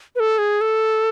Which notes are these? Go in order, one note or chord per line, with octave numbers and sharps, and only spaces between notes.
B4
A4
G#4
A4